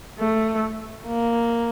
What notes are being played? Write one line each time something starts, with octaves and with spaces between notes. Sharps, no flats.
A3
A#3